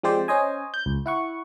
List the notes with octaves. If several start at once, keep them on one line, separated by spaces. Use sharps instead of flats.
F3 G#3 C4 G4 C5 D5
C#4 C5 D#5 G#5
G6
C#2
E4 F#5 C#6